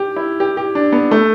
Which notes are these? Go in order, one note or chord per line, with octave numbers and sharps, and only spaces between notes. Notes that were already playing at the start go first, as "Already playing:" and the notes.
Already playing: G4
E4
G4
G4
D4
B3
A3